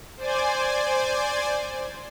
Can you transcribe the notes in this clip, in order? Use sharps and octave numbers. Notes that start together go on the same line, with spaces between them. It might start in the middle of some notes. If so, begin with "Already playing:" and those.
C5 D5 G#5